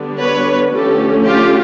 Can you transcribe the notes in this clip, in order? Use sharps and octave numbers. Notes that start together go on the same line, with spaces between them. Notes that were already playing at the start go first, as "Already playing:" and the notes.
Already playing: D3 G3 B3 D4
B4 C#5
D3 F3 A3 C#4 G4 A4
F4 G4